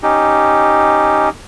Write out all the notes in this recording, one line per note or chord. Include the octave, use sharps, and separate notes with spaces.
C#4 D#4 G4